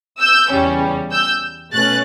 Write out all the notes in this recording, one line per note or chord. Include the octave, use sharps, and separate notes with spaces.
E6 G6
E2 C#3 G3 C#4
E6 G6
B2 A3 C#4 F#6 A6